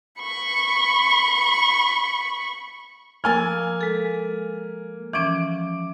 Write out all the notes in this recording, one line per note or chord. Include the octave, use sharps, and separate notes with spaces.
B5 C#6
F3 A#3 G#5 E6 F6 A6
G#3 A4
E3 F3 C#4 D6 D7